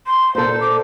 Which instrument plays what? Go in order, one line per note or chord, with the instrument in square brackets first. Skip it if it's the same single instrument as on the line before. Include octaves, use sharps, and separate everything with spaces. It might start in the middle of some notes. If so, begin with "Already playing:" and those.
[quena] C6
[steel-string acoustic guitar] A#2 A4 [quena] C5
[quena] D6